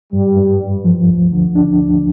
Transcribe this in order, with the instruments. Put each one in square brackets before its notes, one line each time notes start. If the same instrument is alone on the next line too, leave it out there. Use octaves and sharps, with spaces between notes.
[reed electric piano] G2 [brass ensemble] G3
[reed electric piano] G2
G2
F3
D2
D3
D4
D2